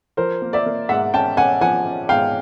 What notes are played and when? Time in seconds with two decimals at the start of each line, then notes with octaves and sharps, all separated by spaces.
0.17 F3 A#4 C5
0.42 A#3
0.53 D5 E5
0.66 A#3
0.89 G#2 E5 F#5
1.13 C#4 G5 A5
1.37 C#4 F#5 G#5
1.61 F3 F#5 G#5
1.86 C#4
2.09 G#2 F5 G5